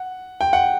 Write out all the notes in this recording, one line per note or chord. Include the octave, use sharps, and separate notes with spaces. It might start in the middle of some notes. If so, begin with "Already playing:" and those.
Already playing: F#5
G5
F#5